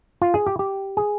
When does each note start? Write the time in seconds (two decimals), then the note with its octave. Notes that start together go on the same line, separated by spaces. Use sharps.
0.22 F4
0.34 G#4
0.47 G4
0.59 G4
0.97 G#4